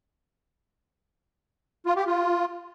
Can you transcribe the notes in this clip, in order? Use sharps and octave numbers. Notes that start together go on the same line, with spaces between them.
F4
G4
F4